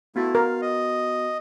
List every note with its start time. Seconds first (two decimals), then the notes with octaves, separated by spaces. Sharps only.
0.16 A3 B3 E4 F#4 A6
0.35 A#4 F5
0.62 D#5